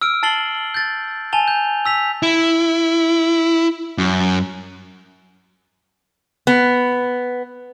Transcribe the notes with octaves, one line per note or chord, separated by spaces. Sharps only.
E6 F6 D7
A5 A6 C7 F#7 G7
G6 A6
G#5 A5 F7 G7
G6
E6 B6 F7
E4
F#2
B3